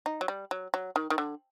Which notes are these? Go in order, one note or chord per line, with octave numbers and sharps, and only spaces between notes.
D#4
F#3
G3
F#3
F#3
D#3
D#3
D3